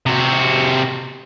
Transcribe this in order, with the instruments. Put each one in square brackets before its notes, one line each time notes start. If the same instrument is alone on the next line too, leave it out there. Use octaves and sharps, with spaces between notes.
[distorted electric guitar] C3 F#4